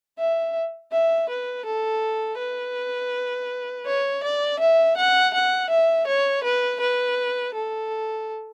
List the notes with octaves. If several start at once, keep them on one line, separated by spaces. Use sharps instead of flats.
E5
E5
B4
A4
B4
C#5
D5
E5
F#5
F#5
E5
C#5
B4
B4
A4